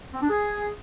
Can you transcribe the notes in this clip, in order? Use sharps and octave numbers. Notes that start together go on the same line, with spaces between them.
C4
D4
G#4